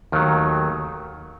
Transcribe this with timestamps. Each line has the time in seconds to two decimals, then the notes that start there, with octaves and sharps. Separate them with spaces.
0.12 D#2 D#3 F#3 A3